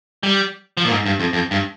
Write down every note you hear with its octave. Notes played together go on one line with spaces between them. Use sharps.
G3
F3
A#2
G#2
G2
F2
F2
G2